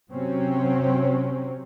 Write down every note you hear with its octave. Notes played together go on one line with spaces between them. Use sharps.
C3 F#3 C4 C#4